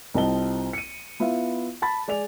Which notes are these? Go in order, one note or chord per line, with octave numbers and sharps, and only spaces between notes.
C2 C4 F4 D#5 A5 G7
C#7 D#7
B3 E4 F4 E5 F5
A5 B5 A6
G#3 D5 G#5 F7